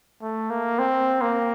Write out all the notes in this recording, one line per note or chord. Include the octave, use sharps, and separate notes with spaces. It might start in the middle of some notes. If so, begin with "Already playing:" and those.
A3
A#3
C4
A#3